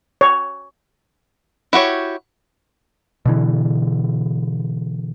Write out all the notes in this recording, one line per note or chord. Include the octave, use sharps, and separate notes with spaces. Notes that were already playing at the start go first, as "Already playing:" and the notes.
C#5
E4 F#4 G4 C#5
B2 D3 E3